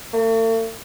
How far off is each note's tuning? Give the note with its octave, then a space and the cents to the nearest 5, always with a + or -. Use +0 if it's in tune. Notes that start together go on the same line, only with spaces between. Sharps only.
A3 +45